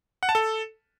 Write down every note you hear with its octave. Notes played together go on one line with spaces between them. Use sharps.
F#5
A5
A4